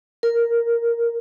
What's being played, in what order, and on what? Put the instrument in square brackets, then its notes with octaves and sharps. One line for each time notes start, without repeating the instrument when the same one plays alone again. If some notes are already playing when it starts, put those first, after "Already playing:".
[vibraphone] A#4